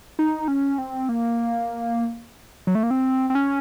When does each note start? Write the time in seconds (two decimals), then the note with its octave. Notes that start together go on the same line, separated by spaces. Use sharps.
0.19 D#4
0.48 C#4
0.78 C4
1.09 A#3
2.67 F#3
2.75 A3
2.83 A#3
2.91 C4
3.30 C4
3.35 C#4